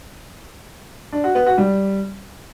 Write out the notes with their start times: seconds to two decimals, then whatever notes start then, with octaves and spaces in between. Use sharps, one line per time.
1.12 D4
1.24 F#4
1.35 B3
1.46 F#4
1.58 G3